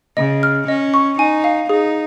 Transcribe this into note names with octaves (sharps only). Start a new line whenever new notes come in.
C#3 D#5
F6
C#4 D#5
C#6
D#4 G#5
F5
D#4 G#4